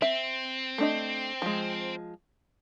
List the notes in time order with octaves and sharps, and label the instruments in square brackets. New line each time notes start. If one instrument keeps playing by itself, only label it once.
[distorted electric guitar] C4 [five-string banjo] E5
[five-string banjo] A3 D4 D#5
F3 G#3